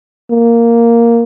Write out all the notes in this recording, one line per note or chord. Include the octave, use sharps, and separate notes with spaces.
A#3